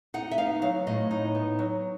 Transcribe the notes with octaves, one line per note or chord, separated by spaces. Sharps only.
D#4 F#5
E5
B3 F5
F#3 F5
A2 D#5
D#4
B3
F#3